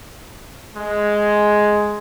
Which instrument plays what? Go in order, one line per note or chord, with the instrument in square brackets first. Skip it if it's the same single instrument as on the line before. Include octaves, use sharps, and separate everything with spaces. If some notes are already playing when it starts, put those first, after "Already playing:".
[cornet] G#3